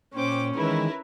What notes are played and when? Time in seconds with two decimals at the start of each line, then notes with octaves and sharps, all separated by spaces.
0.14 A#2 C#4 C5 G5 D6
0.56 D#3 E3 G#3 E4 A#4 B4